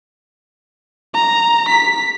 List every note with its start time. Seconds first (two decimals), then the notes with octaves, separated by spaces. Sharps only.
1.14 A#5
1.69 B6